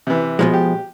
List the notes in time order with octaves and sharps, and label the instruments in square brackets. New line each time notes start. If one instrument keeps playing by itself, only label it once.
[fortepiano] C3 E3
[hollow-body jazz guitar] B2 F3 G#3
[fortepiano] G4